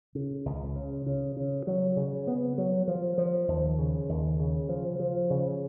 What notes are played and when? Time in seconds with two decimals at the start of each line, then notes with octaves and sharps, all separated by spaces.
0.15 C#3
0.45 C#2
0.76 C#3
1.06 C#3
1.37 C#3
1.67 F#3
1.97 C#3
2.27 B3
2.58 F#3
2.88 F3
3.18 F3
3.48 D#2
3.79 C#3
4.09 D#2
4.40 C#3
4.69 F3
5.00 F3
5.30 C#3